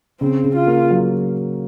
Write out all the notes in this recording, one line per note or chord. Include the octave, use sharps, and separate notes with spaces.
C#3 C4
C#3
F4
A#3
F#3